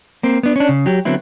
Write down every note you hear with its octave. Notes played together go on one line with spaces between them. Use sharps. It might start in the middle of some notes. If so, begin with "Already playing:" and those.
A#3 C4
B3 D4
C#4 D4
C#3
F#3 G4
D3 F#3 B3 C4 E4